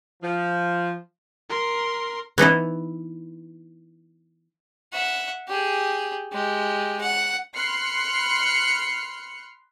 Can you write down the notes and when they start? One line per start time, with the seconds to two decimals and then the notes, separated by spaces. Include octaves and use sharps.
0.23 F3
1.50 A#4 C6
2.38 E3 B3 D#4 E4
4.93 E5 F#5
5.48 G4 G#4
6.33 G#3 G4
7.00 F#5
7.56 B5 C6 F6 F#6 C7 C#7